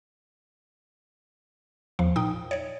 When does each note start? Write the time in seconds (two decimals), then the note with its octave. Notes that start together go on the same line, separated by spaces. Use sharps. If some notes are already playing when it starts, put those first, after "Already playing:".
1.99 E2 F3
2.16 A#2 D#4 G5 D#6
2.51 C#5 D5